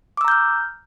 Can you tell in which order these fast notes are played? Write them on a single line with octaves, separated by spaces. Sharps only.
D6 E6 A#5 G6 F6